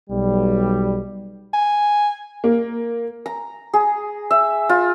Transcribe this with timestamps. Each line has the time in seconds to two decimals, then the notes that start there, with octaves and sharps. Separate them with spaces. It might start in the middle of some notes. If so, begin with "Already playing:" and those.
0.10 B1 G3
1.54 G#5
2.44 A#3
3.26 A#5
3.74 G#4
4.31 E5
4.69 F4